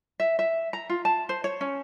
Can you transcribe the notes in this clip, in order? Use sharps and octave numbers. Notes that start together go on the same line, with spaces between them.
E5
E5
A#5
F4
A5
C5
C#5
C#4